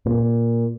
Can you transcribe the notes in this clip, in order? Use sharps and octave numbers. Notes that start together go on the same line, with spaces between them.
A#2